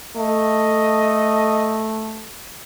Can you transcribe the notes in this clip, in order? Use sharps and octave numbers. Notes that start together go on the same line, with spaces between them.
A3 D#5